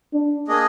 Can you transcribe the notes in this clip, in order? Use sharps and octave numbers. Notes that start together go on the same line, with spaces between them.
D4
A#3 D4 G#4 D#5